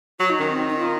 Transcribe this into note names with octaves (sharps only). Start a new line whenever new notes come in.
F#3 F#4
D#4
D#3 C#4
C4
D#4
F4